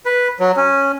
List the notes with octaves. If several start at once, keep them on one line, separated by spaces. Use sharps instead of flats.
B4
F#3
C#4